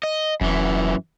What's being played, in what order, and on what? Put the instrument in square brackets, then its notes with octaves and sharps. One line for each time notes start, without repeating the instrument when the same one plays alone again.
[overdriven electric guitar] D#5
[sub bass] E1 [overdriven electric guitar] F#2 E3